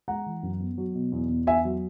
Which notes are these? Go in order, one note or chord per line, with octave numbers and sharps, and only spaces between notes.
G#3 F#5 A#5
E3
F#2
B3
F#3
B2
E2
E2
B3 E5 G#5
F#3